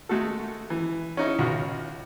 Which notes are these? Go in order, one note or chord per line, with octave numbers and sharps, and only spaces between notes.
G#3 A3 F#4 A4
E3
C#4 D#4 E4
C#2 F4 F#4